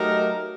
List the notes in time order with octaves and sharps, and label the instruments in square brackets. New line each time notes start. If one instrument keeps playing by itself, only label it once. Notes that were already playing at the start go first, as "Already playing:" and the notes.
Already playing: [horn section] F#3 A3 D#4 G4 A#4